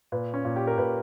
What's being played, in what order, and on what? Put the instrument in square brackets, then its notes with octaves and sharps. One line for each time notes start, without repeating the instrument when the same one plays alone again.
[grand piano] A#2 B4
C#4
A#2
G4
A#4
A#2 B4